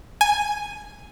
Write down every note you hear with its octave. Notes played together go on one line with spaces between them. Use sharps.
G#5